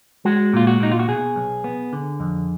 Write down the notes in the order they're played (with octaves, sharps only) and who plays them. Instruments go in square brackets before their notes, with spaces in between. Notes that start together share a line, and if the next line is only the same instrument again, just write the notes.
[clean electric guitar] G#3 F#4
A#2 F4
F#4
A#2 D#4
F4
F#4
B2 G#4
B1
B3
D3
F2